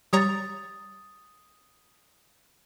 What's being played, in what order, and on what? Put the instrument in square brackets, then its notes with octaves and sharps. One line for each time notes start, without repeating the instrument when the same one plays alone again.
[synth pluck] G3 C#5 A#5 [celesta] D#6 A6